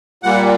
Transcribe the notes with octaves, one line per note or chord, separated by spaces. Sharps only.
A#2 G3 A#3 F#5